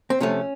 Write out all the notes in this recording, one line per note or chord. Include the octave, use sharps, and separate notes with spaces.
C4
C3 F3 A3 C#4